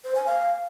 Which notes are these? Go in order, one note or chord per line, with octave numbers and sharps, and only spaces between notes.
C5
G#5
F5